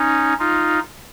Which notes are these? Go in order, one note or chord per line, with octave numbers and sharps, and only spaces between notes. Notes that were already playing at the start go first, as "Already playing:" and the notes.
Already playing: C#4 D#4
D#4 F4